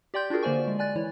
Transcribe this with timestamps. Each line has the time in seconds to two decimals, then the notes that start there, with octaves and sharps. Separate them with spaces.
0.14 G4 D5 G5 C6 G6
0.30 D4 F4 F#4 G#4 A#4
0.43 D3 A#3 C5 D5 G#5 C#6
0.68 G#3
0.79 D5 G#5 F#6 A6
0.96 E3 E4 C#5